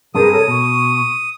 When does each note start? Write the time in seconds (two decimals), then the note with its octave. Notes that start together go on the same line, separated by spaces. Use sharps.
0.15 G2 C3 D4 G#4 A#4 B4 D#6
0.31 A4 A#4 C#5
0.48 B2 C#6